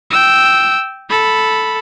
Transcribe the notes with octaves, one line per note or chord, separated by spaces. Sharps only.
G5 E6
A4 B5